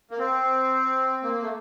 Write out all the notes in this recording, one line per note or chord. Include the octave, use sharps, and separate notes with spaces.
A#3
C4
A#3
A3